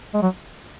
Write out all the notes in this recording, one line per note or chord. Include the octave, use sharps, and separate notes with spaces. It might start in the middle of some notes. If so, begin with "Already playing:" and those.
G#3
F#3